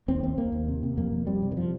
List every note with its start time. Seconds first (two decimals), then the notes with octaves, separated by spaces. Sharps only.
0.08 D#2 C4
0.23 D#2 C4
0.38 D#2 A#3
0.52 D#2
0.68 C3
0.83 C3
0.97 F2 A#3
1.12 F2
1.27 C3 G3
1.42 C3
1.52 D#3
1.57 F3